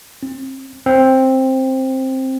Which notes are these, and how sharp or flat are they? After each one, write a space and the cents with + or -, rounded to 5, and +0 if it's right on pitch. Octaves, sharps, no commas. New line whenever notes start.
C4 +35
C4 +10